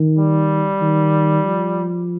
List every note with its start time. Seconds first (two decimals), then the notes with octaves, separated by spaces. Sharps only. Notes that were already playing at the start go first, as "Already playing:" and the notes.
Already playing: D#3
0.17 G3
0.81 D#3
1.45 F3